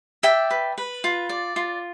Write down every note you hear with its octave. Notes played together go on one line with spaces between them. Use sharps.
D5 E5 G5
B4
B4
F4
D5
F4